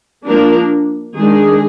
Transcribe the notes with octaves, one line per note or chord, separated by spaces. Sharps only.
F3 A#3 D4 A#4
D#3 G#3 D4 G#4